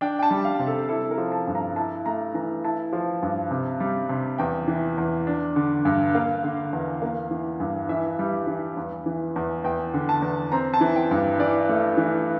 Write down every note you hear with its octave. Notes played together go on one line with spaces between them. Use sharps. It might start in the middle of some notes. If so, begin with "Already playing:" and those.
D4 G5
G5
A5
G3
F5
C3
A4
E4 A4
A#4
F3
A5
G2
A#5
E4 A5
A3 A#5
E3 A#5
E4 A5
F3
G2
C3
G3
C3
E2 G5
E3
E2
D4
D3
G2
A#3 F5
D3
E2
A#3
E3
G2
E3 E5
G3
E3
E2
E3
E2
E2 G5
D3
A5
E2
C4 A#5
A5
E3
G5
G2
E3 D5
A3
E3